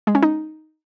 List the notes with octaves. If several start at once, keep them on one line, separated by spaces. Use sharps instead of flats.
G#3
C#4
D#4